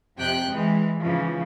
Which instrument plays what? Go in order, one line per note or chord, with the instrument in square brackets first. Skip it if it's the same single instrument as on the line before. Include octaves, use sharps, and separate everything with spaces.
[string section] F2 C3 G5 F#6
E3 G#3
G#2 C#3 E3 F3